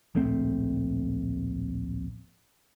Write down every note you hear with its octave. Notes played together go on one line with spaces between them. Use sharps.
D1 A#1 A3 C4